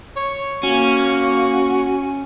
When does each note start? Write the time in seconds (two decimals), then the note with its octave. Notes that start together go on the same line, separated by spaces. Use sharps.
0.16 C#5
0.63 A#3 C#4 F#4